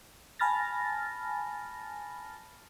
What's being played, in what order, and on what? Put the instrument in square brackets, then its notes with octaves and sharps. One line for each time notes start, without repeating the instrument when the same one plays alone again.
[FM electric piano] G#5 A5 B5 F6 A6 A#6